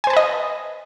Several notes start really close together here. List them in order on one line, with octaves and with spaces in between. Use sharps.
G#5 C5 A5 B4 D#5